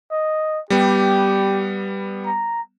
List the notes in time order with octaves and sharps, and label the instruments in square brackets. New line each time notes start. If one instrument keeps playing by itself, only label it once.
[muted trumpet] D#5
[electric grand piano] G3 B3 [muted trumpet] G4
[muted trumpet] A#5